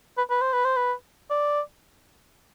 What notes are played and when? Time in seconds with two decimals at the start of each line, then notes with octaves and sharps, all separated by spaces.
0.17 B4
0.30 B4
0.41 C5
0.53 B4
0.64 C5
0.76 B4
1.30 D5